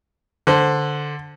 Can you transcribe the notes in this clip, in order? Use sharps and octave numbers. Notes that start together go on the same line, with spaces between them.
D3 C5